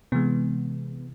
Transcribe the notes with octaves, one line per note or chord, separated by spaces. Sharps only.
C3 E3 G#3 B3